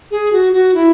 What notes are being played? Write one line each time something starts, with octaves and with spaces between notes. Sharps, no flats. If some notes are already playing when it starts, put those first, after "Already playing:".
G#4
F#4
F#4
E4